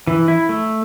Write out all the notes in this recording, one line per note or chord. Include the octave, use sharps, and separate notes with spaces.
E3
E4
A3